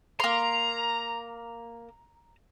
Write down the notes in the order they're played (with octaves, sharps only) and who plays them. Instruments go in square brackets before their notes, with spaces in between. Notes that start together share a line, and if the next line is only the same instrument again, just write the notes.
[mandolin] A#3 C6 [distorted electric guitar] A#5